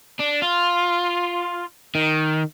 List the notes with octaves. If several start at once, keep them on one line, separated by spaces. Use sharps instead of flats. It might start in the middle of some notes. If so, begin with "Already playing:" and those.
D4
F4
D#3